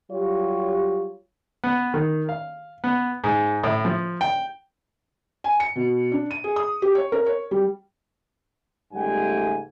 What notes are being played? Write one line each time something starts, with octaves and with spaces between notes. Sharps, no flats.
F#3 G3 F4 G4 C#5
B3
D#3
F5
B3
G#2
A2
F3
G5
G#5
C#7
B2
D4
D#7
G#4
D#6
G4
C#5
A#4
C#5
G3
C#2 G#2 G3 A3 G5 G#5